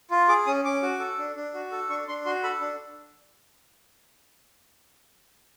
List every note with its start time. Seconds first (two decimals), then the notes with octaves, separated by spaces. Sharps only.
0.11 F4
0.29 G#4 D6
0.46 C#4 D#6
0.65 C#4 D6
0.83 F#4
1.00 A4
1.19 D4
1.36 D4
1.54 F#4
1.72 A4
1.90 D4 C#6
2.08 D4 C6
2.26 F#4 C6
2.43 A4 B5
2.61 D4